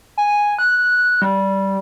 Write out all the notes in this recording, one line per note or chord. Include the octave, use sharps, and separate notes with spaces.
G#5
F#6
G3